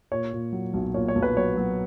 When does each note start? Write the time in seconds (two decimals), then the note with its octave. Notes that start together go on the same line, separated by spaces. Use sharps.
0.11 A#2 C#5
0.33 A#2
0.52 F#3
0.74 B1
0.94 A#2 C#5
1.08 C#5
1.15 B1
1.22 B4
1.37 F#3 C#5
1.57 F#3